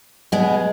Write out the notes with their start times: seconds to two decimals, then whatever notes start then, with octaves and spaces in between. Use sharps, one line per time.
0.32 B2 G#3 B3